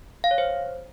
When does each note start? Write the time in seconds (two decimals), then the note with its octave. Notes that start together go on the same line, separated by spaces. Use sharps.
0.24 F5
0.31 C#5
0.38 C5